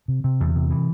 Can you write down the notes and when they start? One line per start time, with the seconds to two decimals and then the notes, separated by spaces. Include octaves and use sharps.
0.08 C3
0.24 C3
0.40 E2
0.56 C3
0.70 E3